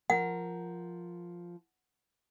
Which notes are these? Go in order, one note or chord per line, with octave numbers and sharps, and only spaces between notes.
F3 A#4 F#5